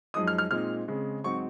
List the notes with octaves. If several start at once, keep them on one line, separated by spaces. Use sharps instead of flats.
F#2 F3 G#3 D#4 D#6
F6
F6
A#2 G#3 C4 D#4 F6
C#3 G#3 C4
G#2 F#3 C4 D#4 C#6